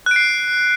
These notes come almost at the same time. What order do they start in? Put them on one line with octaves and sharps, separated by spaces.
F#6 D7 C7